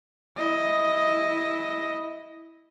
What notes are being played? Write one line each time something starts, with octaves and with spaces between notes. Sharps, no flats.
E4 D#5